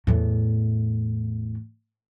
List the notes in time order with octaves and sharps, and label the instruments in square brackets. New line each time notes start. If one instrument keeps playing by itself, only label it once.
[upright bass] E2 A2